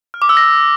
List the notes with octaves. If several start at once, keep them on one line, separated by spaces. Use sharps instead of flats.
F6
D6
E6
A#6